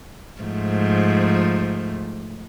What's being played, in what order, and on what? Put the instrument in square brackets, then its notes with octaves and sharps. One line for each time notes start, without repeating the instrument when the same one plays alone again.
[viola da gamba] G#2 F3 A3